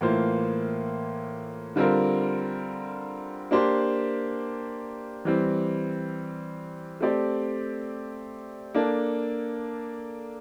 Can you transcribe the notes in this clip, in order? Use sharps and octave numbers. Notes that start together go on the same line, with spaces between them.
A2 E3 A#3 F4 C5
D3 G3 C4 F4 A#4
A#3 D4 G4 C5
E3 G3 C4
A3 C4 G4 D5
A#3 D4 A4